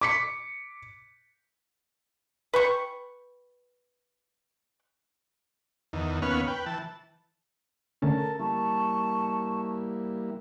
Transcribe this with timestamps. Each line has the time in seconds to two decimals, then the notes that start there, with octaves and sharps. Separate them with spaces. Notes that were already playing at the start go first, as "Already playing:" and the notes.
0.01 D6 B6 C#7
2.54 B4 G5 C#6
5.93 E2 D#3
6.22 D#2 B3 C#4 B4 C#6 F6
6.47 B4 G5
6.66 E3 A5
8.02 D3 A3 C#4 A4 A#4 A5
8.39 G3 A#3 E4 A5 C#6